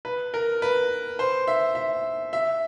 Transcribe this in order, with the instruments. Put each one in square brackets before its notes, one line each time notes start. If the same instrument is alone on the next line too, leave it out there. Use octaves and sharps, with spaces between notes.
[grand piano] B4
A#4
B4
C5
E5
E5
E5